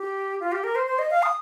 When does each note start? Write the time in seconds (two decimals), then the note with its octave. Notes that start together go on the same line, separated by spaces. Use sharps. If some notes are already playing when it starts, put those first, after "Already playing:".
Already playing: G4
0.40 F4
0.52 G4
0.64 A#4
0.75 C5
0.87 C5
0.99 D#5
1.11 F5
1.23 D#6